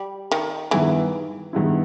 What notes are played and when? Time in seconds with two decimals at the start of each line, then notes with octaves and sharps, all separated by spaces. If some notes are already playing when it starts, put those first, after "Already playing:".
Already playing: G3
0.32 D#3
0.71 G2 D#3 E3 G#3 B3 E4
1.53 G2 D#3 G#3 B3 E4